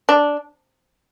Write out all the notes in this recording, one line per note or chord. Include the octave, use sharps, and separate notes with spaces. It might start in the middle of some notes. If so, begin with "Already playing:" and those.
D4